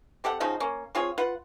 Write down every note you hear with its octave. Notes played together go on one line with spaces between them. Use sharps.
C4 G4 A4 F#5
C#3 F3 D#4 F#4
A#3 C#4
C4 F4 G#4 C#5
F4 B4 F#5